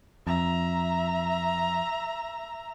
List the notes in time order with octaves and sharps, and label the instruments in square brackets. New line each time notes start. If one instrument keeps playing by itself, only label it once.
[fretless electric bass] F2 [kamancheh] E5 A#5